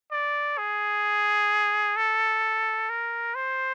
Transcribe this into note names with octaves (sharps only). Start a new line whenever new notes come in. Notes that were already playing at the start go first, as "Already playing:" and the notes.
D5
G#4
A4
A#4
C5